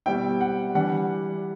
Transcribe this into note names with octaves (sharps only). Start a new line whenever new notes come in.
B2 G3 C4 E4 G5
F#5
E3 G3 D4 F#5